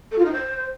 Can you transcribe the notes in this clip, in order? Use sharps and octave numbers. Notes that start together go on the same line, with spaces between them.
A4
F4
D#4
C5